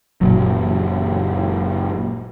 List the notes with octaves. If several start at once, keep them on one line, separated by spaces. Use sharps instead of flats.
F#1 A#2 F#3